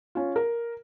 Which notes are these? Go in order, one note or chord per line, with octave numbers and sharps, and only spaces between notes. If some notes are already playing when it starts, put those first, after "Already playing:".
C#4 F4
A#4